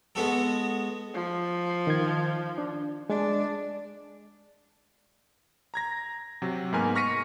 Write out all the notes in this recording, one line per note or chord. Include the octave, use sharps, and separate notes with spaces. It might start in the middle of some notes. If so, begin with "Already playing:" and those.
G#3 B3 F#4 A4
F3
D#3 G#6
D4
G#3 D4
A#5 G#6 A#6
C3 F#3
G#2 A#3 B3 A#4 G#5 F6
C#6 F6 A#6 B6 C#7 D#7